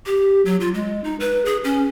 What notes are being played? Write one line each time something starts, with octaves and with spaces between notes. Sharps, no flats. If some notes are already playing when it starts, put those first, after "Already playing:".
G4
F#3
F4
G#3
D#4
B4
G#4
C#4